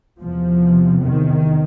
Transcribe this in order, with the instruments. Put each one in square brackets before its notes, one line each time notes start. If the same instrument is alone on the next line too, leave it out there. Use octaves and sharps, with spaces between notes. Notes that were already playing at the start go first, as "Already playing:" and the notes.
[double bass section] E2 C3 F3
D#3